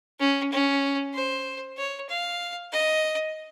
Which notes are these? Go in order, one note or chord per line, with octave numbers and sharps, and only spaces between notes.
C#4
C#4
C5
C#5
F5
D#5